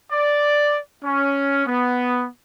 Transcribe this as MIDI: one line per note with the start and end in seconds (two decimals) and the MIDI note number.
0.11 0.79 74
1.04 1.64 61
1.66 2.28 59